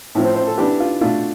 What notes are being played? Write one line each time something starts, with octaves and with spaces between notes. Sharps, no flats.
A2 F3 C4
C5
C5
A4
E3 B3 D4 G4
F4
B2 A3 D4 F4